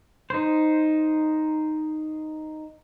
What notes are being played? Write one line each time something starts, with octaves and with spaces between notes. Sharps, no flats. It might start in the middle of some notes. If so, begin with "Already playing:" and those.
D#4 C5